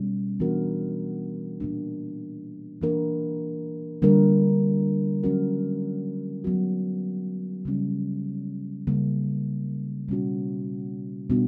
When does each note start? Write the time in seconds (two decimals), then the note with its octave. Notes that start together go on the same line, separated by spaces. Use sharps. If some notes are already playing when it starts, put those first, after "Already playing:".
Already playing: B2 G3 C#4
0.40 E3 B3 D4 F#4 A#4
1.60 A#2 A#3 D4
2.81 E3 A#3 D4 A#4
4.02 D3 G3 A#3 D4 A#4
5.23 F#3 C#4 F#4 A#4
6.44 F#3 B3 F#4
7.65 C#3 G3 C#4
8.87 C#3 G3 A#3
10.08 B2 G3 C#4 F#4
11.30 B2 G3 B3 D4 F#4